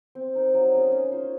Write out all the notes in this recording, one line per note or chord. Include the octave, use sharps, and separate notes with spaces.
C4
D#4 A#4
F#3
C#4 G#4 D#5
C#4
F4 C5